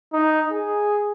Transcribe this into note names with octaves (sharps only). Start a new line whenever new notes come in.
D#4
G#4